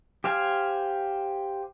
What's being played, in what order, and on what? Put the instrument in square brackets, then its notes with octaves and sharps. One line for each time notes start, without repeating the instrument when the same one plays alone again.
[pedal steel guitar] G4 C5 F5 G#5